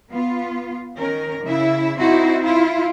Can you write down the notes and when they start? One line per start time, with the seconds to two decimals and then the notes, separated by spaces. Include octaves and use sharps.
0.11 B3 F4
0.97 D#3 C#4 A#4
1.44 C#3 E4 E5
1.99 C4 D#4 E4 F#4 C5
2.44 E4 F4